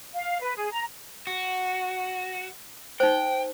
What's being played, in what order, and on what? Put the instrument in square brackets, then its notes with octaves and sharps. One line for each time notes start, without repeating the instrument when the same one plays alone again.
[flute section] F5
B4
G#4
A#5
[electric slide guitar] F#4
[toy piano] D#4 C5 [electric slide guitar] G5